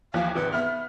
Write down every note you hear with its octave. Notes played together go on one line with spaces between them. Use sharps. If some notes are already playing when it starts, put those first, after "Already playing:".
D#2 E3 F3 F5
G#1 C3 B4
B3 E5 F6